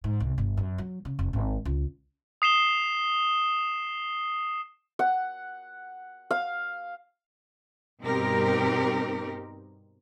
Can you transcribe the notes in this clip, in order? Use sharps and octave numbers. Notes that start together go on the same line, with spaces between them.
G#2
C2
G1
F#2
F#3
C#3
F1
G#1
C#2
D#6 C7 E7 G7
F#5
F5
G2 B2 C4 D#4 G4 A#4